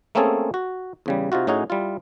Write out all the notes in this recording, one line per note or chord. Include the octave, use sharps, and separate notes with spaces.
A3 A#3 C4 C#4 G#4 A4
F#4
E2 C#3 G3
C3 D#4 F4 F#4
A2 C#4 D#4 F#4 G#4
G3 E4 F4